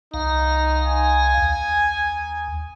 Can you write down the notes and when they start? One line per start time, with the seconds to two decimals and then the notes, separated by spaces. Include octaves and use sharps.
0.14 C2 D#4 F5 A#5
0.87 G#5
1.38 D#2